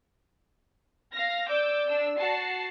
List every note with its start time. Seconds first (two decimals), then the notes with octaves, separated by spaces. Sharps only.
1.13 F5 F6 A#6
1.50 D5 D6 E6 G6
1.89 D4 E6
2.18 F#4 A5 C7